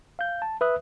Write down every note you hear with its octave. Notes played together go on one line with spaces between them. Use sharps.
F5 G6
A5
B4 E5 D#6 F#6